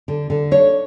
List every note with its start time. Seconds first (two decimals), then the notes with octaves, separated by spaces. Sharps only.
0.08 D3
0.30 D3
0.51 D4 C#5